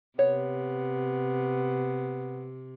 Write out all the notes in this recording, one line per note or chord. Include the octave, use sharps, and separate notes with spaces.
C3 B3 C#5